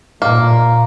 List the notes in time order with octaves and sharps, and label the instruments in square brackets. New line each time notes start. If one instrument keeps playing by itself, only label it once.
[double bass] A#2 [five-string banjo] A#3